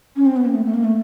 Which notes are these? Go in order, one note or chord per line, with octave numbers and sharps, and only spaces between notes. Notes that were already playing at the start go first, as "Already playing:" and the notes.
C#4
C4
B3
A#3
A3
A3
A#3
A3